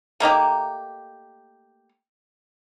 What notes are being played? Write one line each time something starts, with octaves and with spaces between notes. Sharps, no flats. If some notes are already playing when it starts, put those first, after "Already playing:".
A3 A#3 D#4 G4